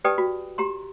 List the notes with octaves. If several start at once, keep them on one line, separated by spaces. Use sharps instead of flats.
G4 B4 D5 G5 A5 D#6
F#4
G4 A#5 C6